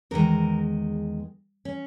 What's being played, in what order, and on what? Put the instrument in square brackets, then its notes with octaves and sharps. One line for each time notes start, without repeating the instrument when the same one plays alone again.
[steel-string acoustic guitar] E2 D#3 G#3 A#4
C#4